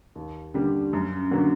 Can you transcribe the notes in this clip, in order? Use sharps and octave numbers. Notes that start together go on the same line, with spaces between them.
D#2
D3 G3 A#3
F#2
D3 F#3 A#3